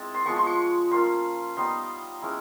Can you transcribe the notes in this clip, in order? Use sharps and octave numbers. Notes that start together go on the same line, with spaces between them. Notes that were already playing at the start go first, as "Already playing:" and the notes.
Already playing: G#3 C4 E4 A5
C6
F3 G#3 B3 C#6
C6
C#6
A#3 C#4 F4 C6
G3 B3 D#4 C6
G#3 C#4 E4